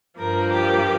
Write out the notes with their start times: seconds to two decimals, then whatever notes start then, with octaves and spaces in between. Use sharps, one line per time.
0.19 G2 F3 A#3 A#4
0.51 G4